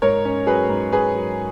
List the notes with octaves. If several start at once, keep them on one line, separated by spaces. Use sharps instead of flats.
G#2 A#4 C#5
C#4
F#3 G#4 B4
G#2
G#2 G#4 B4
F#3